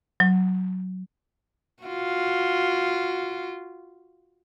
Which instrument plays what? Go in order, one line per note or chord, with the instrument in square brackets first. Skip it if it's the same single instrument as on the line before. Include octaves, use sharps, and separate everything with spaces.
[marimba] F#3
[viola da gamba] F4 F#4